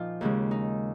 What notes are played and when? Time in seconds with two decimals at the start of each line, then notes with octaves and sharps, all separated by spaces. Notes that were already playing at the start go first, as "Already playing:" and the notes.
Already playing: A#2 F3 D#4 F4
0.21 D#2 C#3 G#3
0.51 D#4